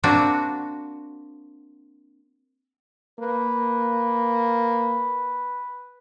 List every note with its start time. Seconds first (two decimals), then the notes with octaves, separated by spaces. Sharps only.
0.04 A#3 C4 D4 F#4
3.20 A#3 B4